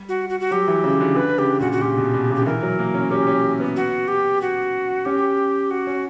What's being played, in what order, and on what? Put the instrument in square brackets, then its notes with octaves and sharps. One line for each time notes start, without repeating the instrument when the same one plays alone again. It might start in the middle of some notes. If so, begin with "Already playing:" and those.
Already playing: [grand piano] G3
[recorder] F#4
F#4
F#4
[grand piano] F#3 [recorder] G4
[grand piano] E3
C#3
D3
[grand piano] D3 [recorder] B4
[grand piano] C#3 [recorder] G4
[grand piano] A#2 [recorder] F#4
[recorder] F#4
[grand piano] A#2 [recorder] G4
[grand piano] B2
B2
[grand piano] C#3 [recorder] G4
[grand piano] D3
[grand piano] E3 [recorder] A#4
[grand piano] F#3
A#3
C#4
[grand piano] C#4 [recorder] G4
[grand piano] C#4
B3
[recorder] F#4
G4
F#4
[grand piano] C#4 [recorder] G4
[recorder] F#4
[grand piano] C#4